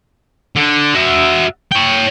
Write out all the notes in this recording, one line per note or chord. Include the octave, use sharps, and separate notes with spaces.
D3
F#4 E5
C#5 G5